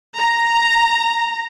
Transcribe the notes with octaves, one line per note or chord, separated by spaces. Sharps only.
A#5